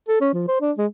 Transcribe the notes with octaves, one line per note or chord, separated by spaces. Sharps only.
A4
C#4
F3
C5
D4
G#3